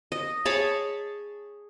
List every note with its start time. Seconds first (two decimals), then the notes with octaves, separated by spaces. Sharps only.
0.12 D#5
0.45 G#4 C#5 A5 B5